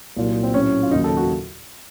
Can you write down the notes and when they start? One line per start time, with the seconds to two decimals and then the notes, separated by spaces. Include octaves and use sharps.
0.16 C2 A#2 F#3
0.43 C4
0.54 A2 F#3 C#4
0.83 F4
0.91 D#2 C#3 F#3 D#4
1.04 A4
1.17 F#4